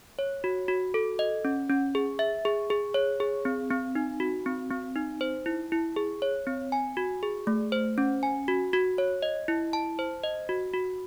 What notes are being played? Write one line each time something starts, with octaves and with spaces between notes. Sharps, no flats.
C#5
F#4
F#4
A4
D#5
C#4
C#4
G#4
E5
G#4
G#4
C#5
G#4
C4
C4
D#4
F#4
C4
C4
D#4
C5
E4
E4
G#4
C#5
C4
G#5
F#4
G#4
A3
C5
C#4
G#5
F#4
F#4
C#5
D#5
E4
A5
C5
D#5
F#4
F#4